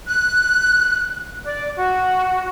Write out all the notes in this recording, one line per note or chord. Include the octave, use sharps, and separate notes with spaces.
F#6
D5
F#4